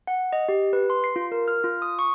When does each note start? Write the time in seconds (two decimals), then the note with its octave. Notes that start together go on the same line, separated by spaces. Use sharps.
0.07 F#5
0.33 D#5
0.49 G4
0.73 B4
0.90 C6
1.04 C7
1.16 F4
1.32 A#4
1.48 F6
1.64 F4
1.82 D#6
1.99 C#6